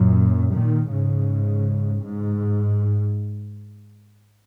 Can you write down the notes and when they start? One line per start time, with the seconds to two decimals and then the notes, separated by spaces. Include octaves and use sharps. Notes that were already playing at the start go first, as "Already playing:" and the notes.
Already playing: F#2 A#2
0.53 A#2 D#3
0.90 G#2 C#3
2.01 G#2